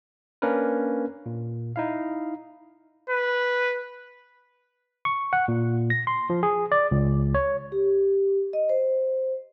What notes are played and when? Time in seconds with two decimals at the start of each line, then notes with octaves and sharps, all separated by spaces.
0.42 A#3 C#4 D4 A#4 B4
1.26 A#2
1.76 D#4 E4 F5
3.10 B4
5.05 C#6
5.33 F#5
5.48 A#2
5.90 A#6
6.07 C6
6.30 F3
6.43 G#4
6.72 D5
6.91 C#2
7.35 C#5
7.72 G4
8.53 D#5
8.69 C5